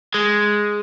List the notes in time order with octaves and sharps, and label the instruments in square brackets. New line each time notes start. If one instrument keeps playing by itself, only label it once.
[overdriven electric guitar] G#3